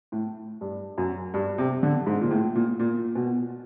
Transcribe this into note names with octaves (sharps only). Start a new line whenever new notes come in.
A2
G2
F#2
G2
C3
D3
G#2
A#2
A2
A#2
A#2
B2